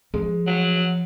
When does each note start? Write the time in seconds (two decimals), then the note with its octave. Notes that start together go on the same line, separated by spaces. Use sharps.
0.14 F3 G#3
0.47 F#3